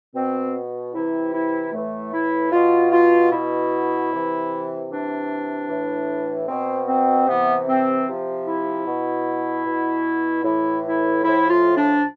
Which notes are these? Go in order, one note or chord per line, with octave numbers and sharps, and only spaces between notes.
B2 C4
C3 E3 E4
E4
A2 E3 A3
E4
B2 F4
F4
B2 E4
C3 E3
C3 E3 D4
A2 E3
B2 C4
C4
C3 E3 B3
C4
C3 F3
E4
B2
B2
A2 E3 E4
E4
A2 F3 E4
F4
D4